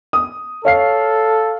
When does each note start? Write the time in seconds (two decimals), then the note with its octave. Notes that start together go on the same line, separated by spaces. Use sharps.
0.13 D#6
0.65 A4 C#5 F5 C7